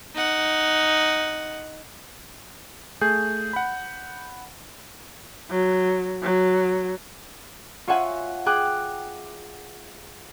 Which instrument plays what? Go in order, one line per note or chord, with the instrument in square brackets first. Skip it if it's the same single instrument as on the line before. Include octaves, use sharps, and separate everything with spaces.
[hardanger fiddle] D#4 F#5
[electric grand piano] A3 G#4 [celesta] G6
[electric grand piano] F#5 B5
[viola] F#3
F#3
[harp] F4 C#5 E5 F#5 G#5
G#4 G5 G#5 D6 F#6